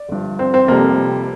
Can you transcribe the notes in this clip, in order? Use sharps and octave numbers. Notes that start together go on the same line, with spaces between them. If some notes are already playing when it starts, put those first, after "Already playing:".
Already playing: D5
G1 G2 F3
C4
C4
F1 F2 C3 G3 A#3